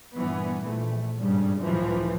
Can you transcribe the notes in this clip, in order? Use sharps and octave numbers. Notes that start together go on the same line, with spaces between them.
G2 A#2 E3 B3
A#1 A3
G#1 G2 C#3 G3
C#2 F#2 A2 E3 F3